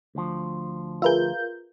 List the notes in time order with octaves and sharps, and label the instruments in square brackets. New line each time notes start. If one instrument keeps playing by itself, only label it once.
[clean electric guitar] D2 F3
[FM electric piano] F4 A#4 G6 [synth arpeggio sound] G#4 B4 E5